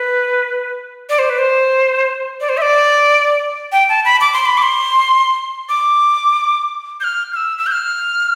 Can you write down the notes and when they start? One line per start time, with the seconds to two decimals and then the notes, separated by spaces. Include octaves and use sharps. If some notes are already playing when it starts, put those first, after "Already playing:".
Already playing: B4
1.09 D5
1.19 C5
1.30 B4
1.38 C5
2.41 D5
2.49 C5
2.57 E5
2.62 D5
3.72 G5
3.89 A5
4.05 B5
4.21 D6
4.33 C6
4.46 B5
4.58 D6
4.62 C6
5.69 D6
7.00 G6
7.04 F6
7.33 F6
7.36 E6
7.58 E6
7.67 G6
7.71 F6